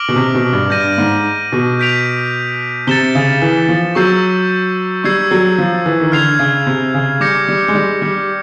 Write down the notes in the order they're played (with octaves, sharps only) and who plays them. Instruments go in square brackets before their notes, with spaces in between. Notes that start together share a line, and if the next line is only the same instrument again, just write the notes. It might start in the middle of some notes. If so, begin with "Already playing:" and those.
Already playing: [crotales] D6 F6 A#6 D7 F#7
[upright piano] B2
C3
B2
G2
[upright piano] G2 [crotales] G6 A#6 D#7
[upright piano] G#2
B2
[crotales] G6 B6 D7 F7
[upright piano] C3 [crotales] A6 C#7 E7 G7
[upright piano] C#3
E3
F3
[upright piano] F#3 [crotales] C#6 E6 G6 C7
[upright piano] G3 [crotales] C#6 E6 G#6 C7
[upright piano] F#3
F3
E3
D#3
[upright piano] D3 [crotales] F6 G#6 C7 F7
[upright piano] C#3
C3
C#3
[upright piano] G3 [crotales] D6 G6 A#6 C#7
[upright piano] G3
G#3
G3
G3